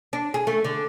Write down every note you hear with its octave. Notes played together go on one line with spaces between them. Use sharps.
D4
G#4
A3
D3